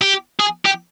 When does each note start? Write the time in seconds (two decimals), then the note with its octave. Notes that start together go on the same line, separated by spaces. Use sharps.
0.02 G4
0.40 G#4
0.65 G4